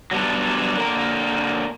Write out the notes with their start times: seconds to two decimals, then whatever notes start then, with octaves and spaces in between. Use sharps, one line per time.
0.11 F#3 G3 B3 D4
0.78 D3 A#3 A#4